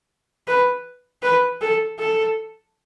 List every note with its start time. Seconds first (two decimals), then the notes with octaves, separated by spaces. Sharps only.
0.48 B4
1.23 B4
1.61 A4
2.00 A4